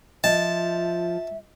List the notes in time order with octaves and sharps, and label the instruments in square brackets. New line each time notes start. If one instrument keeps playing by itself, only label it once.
[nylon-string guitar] F3 [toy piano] D#5 [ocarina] E5 [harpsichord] A5